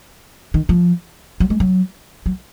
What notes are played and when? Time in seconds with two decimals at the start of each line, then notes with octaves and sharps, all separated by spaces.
0.54 D#3
0.69 F3
1.40 F#3
1.50 G#3
1.60 F#3
2.26 F#3